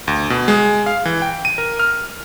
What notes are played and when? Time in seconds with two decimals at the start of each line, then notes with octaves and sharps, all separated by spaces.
0.08 D2
0.30 B2
0.48 G#3
0.86 F5
1.05 E3
1.22 G5
1.45 D#7
1.58 A#4
1.79 F6